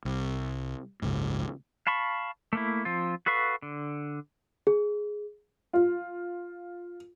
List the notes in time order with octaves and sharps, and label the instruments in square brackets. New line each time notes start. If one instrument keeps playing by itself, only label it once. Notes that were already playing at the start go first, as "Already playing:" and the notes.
[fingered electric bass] C2
F#1 C#2 G#2
[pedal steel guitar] F5 A5 B5 C#6
A3 A#3 E4
F3 C4 F4
F#4 A4 B4 F5 C#6
D3
[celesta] G#4
[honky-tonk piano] F4